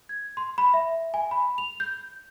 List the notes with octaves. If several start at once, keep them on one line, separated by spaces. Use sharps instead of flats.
G#6
C6
B5
E5
G#5
B5
F7
G6